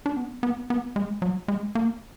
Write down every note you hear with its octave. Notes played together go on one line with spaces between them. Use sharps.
D4
B3
B3
B3
G#3
F#3
G#3
A#3